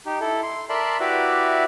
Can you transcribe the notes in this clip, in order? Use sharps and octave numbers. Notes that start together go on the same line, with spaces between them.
D#4 G4
E4 A4
C6
A#4 D5 E5 A5 B5 C6
E4 F#4 G4 B4 D5 E5